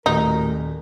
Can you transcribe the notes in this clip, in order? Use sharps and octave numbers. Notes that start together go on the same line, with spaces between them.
D#1 A2 D#4 F#4 G4 A#4